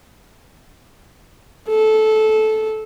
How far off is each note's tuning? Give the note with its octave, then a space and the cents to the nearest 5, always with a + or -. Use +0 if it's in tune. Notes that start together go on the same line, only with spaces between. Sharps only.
A4 -15